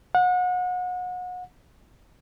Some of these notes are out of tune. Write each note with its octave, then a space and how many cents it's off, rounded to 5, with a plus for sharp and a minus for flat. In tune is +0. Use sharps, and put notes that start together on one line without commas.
F#5 -35